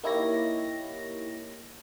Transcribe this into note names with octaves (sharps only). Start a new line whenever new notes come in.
A#3 D#4 E4 G4 C#5 A#6